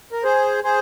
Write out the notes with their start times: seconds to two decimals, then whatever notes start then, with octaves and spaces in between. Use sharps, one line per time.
0.12 A#4
0.23 G#4 C5
0.64 G#4 C5